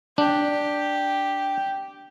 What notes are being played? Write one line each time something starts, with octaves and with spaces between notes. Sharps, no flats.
D4 G4